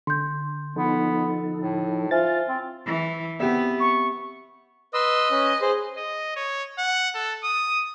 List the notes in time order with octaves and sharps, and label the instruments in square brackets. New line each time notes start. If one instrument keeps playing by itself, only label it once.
[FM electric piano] D3 [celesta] C6 G6
[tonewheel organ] F3 D#4 A4 [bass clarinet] B3
[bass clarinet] A2
[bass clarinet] F4 [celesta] C5 E5 G#5 [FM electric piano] A6
[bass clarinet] C4
[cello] E3
[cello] B3 [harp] C4 G4 E5
[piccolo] C#6
[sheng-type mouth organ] B4 C6 E6 [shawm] D#5
[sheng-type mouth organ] C#4 B4
G#4 C5
[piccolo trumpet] D#5
C#5
F#5
A4
D#6